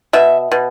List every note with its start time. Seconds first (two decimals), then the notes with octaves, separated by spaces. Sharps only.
0.13 B2 E5
0.52 B2